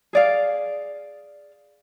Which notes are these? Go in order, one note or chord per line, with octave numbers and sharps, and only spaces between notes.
G#4 D5 F5